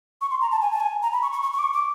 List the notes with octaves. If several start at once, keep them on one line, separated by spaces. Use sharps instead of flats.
C#6
C6
A#5
A5
G#5
A5
G#5
A#5
B5
C#6
C#6
C#6
C#6
D6
C#6
D6